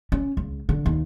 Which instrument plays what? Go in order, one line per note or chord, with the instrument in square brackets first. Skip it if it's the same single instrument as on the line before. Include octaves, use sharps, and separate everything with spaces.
[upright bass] C#4
C#2
D3
D#2